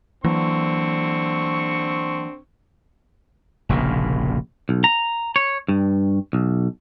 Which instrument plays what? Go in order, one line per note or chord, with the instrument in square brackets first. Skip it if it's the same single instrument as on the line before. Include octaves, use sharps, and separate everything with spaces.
[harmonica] D3 C4 C#6 [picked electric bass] E3 F#3 A#3
[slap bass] F1 A#1 A#2 C#3
[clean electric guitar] B1
A#5
C#5
G2
B1